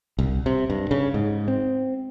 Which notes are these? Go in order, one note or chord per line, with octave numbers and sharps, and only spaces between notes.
C2
C3
G2
C#3
G#2
C4